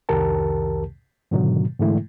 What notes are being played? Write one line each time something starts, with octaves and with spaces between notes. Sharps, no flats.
C2 F2 D#3 G4 A#4 A5
G#2 B2 D3 D#3 F#3
G#2 D3 E3 G#3 A3 E4